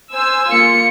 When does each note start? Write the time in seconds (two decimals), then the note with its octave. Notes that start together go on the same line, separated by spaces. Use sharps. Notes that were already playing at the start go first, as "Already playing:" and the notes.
0.14 C5 G#5 E6
0.51 A#3 F4 C#7